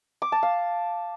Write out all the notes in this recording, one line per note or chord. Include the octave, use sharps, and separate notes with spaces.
D6
A5
F5